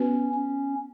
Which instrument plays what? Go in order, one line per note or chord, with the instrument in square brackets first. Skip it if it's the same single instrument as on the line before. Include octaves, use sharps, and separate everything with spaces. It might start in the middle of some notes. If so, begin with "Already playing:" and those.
Already playing: [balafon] B3 F#4 B4 [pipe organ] C#4
[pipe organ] C#4